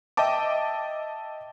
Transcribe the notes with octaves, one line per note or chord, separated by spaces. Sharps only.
D#5 E5 G5 A5 D6